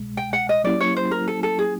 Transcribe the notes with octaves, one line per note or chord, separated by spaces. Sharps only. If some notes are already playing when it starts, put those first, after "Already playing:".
Already playing: C2 B2 G#3
G5
F#5
D#5
F#3 A#3 C#4 E4 G4 D5
C#5
C5
A#4
A4
A4
G#4